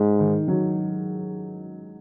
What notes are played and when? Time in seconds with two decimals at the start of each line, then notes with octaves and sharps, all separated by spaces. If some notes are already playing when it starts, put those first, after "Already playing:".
Already playing: G#2 G#3
0.19 D#3
0.48 F#3